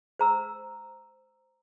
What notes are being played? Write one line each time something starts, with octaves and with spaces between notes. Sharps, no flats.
C5 A#5 E6